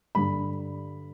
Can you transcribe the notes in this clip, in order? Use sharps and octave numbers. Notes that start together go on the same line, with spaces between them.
G2 D3 G3 B5